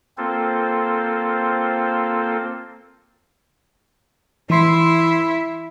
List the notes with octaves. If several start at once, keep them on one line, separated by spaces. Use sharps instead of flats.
A#3 C4 F4 A4 C5
E3 E4 C6 C7